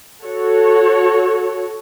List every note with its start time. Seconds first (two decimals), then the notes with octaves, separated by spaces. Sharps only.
0.23 F#4 A4 C#5